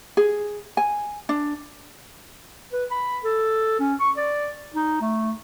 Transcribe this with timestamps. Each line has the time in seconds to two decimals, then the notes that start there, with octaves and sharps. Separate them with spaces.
0.17 G#4
0.77 G#5
1.29 D4
2.73 B4
2.91 B5
3.24 A4
3.80 C#4
4.00 C#6
4.17 D5
4.74 D#4
5.01 A3